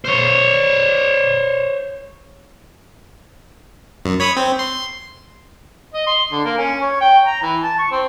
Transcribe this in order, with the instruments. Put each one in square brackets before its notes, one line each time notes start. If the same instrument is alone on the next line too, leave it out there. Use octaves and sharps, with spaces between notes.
[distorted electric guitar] C5 C#5
[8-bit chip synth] F#2
C#5 B5 D#6
C4
C6
[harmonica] D#5
C6
D3
A#3
C#4
C#5
G5
A#5
E3
A5
C#6
C4